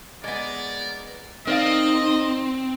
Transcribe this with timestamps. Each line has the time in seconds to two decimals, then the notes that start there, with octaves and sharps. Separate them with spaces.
0.24 G#3 B3 A#4 D5
1.47 C4 D#4 A#4 D5 D#5 F5